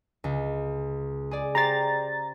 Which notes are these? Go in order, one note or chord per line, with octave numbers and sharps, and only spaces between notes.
C#2
G#4 D5
G4 C5 D5 A#5 A6